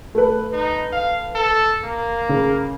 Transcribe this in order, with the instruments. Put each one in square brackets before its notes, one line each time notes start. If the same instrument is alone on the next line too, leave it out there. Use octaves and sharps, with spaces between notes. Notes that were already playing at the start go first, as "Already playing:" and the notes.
[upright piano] A3 B4
[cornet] D#4
F5
A4
A#3
[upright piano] C#3